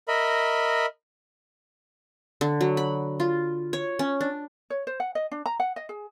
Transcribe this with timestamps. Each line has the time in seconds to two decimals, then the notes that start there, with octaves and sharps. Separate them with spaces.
0.08 A#4 D#5 E5 B5
2.41 D3
2.61 F#3
2.77 B5
3.20 F4
3.73 C#5
3.99 C#4
4.21 D4
4.70 C#5
4.87 C5
5.00 F#5
5.15 D#5
5.32 D4
5.46 A#5
5.60 F#5
5.76 D#5
5.89 G#4